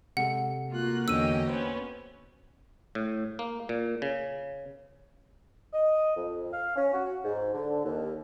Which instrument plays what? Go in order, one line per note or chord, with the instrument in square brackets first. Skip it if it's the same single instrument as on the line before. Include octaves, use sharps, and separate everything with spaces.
[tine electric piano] C3 G#3 A4 [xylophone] F#5
[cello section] A#3 F#4 [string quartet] F4 F#6
[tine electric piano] E2 D3 [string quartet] C#4 D#5 G5 [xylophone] E6 D#7
[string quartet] B3 C#4 [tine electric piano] C5
[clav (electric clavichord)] A2
A#3
A#2
C#3
[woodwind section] D#5
F2
F5
C#4
F#4
G#2
D3
D#2